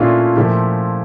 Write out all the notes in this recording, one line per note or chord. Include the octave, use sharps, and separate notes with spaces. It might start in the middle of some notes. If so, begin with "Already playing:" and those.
Already playing: A#2 A3 C#4 D4 E4 F4
A#2 F3 A3 E4 G4